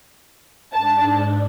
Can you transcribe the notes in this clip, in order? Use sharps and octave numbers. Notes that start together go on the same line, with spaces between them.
G#2 D4 A5